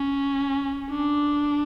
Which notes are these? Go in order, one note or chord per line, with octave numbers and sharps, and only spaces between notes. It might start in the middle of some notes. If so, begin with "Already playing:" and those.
Already playing: C#4
D4